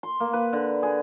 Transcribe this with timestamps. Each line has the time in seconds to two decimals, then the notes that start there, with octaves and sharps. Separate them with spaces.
0.03 C6
0.20 A#3
0.33 B4
0.53 D3
0.83 G#4